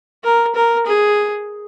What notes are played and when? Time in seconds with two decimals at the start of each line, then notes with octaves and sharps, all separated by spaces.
0.24 A#4
0.55 A#4
0.87 G#4